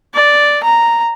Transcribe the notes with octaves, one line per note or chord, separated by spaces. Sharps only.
D5
A#5